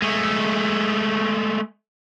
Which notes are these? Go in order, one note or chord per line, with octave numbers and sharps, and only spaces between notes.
G#3 A3